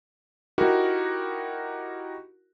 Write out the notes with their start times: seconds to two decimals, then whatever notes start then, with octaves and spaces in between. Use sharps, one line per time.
0.58 D#4 E4 F#4 G4 A#4